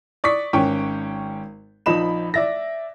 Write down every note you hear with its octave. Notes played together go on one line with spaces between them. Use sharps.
D5 C#6 D#6 B6
G#1 C#4 G5 C#6
A#1 F3 D#4 B5 E7
D5 E5 A#6